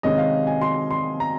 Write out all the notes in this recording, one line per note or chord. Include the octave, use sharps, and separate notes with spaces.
C3 D#3 G#3 C#4 D#5
F5
G#5
C6
C6
A#5